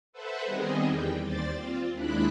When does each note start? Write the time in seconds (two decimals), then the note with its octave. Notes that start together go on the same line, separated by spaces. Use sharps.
0.13 A4 B4 C5 E5 F#5
0.43 D#3 G3 B3 C4 G#4 D#5
0.85 E2 G3 G5
1.21 D#2 C5 D5 A6
1.55 C4 F4
1.92 D#2 G#3 D4 E4 B5 F#6